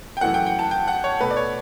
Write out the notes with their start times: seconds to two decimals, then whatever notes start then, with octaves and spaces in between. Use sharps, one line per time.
0.17 G5
0.21 F#2 E3 A3 F#5
0.34 G5
0.46 G5
0.59 A5
0.71 G5
0.88 F#5
1.04 C#5
1.20 B2 A3 B4
1.31 D5
1.36 C#5